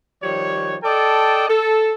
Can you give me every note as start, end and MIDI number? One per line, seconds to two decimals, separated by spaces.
0.23 0.76 51
0.23 0.76 53
0.23 0.76 55
0.23 0.76 73
0.83 1.47 69
0.83 1.47 74
0.83 1.47 75
0.83 1.47 79
0.83 1.47 81
1.49 1.92 69